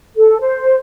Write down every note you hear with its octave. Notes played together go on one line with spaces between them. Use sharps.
A4
C5